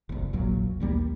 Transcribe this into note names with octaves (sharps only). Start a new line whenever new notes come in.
F#1 C2
E1 A#1 A#2 F#3
A#1 D#2 G3 A#3